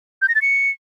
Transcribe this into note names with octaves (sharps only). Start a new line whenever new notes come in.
G6
A#6
A6
C#7